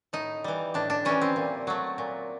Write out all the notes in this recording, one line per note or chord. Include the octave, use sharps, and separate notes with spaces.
A2 D#4
E3 G3
A2 D4
D4
E3 G3 C#4
C4
A#2
F#3 A3
A#2